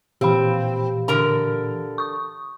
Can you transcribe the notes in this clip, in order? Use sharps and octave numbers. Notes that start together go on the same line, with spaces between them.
A#2 E3 C4 G4 F5 B5
D3 A#4 A#5
C#6 D#6